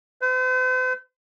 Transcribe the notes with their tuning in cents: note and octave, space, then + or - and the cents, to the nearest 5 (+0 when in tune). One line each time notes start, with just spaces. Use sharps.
C5 -45